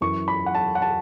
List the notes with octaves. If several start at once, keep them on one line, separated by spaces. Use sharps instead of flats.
F#2 E3 C#6
B5
F#5
A5
F#5
A5